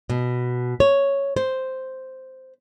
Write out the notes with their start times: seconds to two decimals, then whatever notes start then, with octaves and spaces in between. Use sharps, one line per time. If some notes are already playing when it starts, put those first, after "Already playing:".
0.09 B2
0.80 C#5
1.36 C5